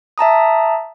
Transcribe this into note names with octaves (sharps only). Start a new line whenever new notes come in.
E5 A5 A#5 D#6